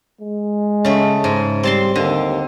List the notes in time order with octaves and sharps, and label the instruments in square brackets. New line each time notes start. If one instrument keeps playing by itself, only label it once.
[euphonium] G#3
[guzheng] C#3 A3
G#2
[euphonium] G3 [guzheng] C4 A5 C6
[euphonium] D#2 [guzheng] D3